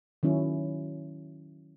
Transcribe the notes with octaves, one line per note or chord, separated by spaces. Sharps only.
D#3 F#3 C#4 E4